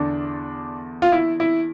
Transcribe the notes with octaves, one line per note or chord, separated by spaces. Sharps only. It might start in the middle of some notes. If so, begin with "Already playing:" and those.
Already playing: E2 D3 D4
F4
E4
E4